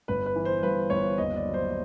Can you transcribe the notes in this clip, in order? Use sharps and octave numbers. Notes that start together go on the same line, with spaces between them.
G1 B4
B4
E3
C5
G2 B4
G1 C#5
D#2 D#5
D5
F#3
C5